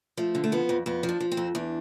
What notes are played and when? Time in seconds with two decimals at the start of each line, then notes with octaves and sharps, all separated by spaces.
0.17 F3 A3
0.35 D3
0.44 A3
0.52 F3 B3
0.69 F2
0.86 F2 B3
1.03 F3
1.09 D4
1.20 F3
1.32 C4
1.37 F2
1.55 E2 D4